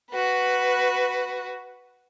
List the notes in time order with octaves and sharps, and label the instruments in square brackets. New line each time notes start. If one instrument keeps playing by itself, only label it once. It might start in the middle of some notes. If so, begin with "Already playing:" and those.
[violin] F#4 B4